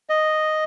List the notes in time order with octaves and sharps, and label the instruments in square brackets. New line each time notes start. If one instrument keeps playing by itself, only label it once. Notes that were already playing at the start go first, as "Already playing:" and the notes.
[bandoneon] D#5